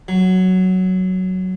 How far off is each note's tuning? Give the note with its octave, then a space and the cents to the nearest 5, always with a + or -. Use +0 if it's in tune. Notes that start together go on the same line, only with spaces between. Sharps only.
F#3 +5